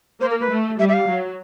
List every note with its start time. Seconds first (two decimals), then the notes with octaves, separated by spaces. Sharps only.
0.21 A#3 C5
0.31 A#4
0.41 B4
0.51 A3
0.79 G3 E5
0.89 E5
0.93 F5
1.08 F#3